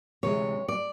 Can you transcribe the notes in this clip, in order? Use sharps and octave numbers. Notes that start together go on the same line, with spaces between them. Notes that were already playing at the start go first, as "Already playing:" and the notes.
D2 C3 E3 G#3 C#5
D5